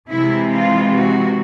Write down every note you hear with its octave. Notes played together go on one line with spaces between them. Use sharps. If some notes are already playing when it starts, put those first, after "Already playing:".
C3 E3 G#3 C4 E4
F4
F#4